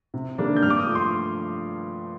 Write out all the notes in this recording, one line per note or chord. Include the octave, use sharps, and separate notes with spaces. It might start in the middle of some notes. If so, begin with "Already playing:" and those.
C3
D#3 G3 A#3 D4
G6
G2 F6
D6
D#6
F3 A3
C6